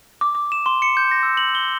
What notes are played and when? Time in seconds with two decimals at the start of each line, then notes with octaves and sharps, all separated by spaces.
0.21 D6
0.35 D6
0.52 E7
0.66 C6
0.82 C#7
0.97 G6
1.11 A#6
1.23 E6
1.37 F#7
1.55 G7